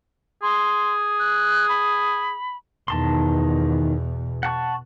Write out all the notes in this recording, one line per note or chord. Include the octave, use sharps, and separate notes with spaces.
G#4 C6
F#6
B5
E2 B2 D#3 A5 C6
F#5 A5 C#6